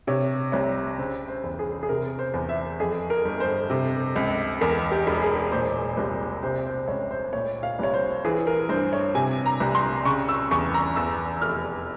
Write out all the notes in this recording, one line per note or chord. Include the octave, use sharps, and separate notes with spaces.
C3 C#5
C2 C#5
C#3 C5
C5
E2
G#4
G#4
C3 A#4
C5
E2
E5
F2 G#4
A#4
G1
C5
C3
C#2
E2 A#4
G4
E1
G#4
A#2 C5
C2
C3 C5
C5
C#2 C#5
C5
A#2 C#5
F5
C2 C#5
C5
E3 G#4
A#4
G2 C5
C#5
C3 G#5
A#5
C2
C6
C#3 C#6
E6
E2 C#6
A#5
E2 E6
E6
F1 F6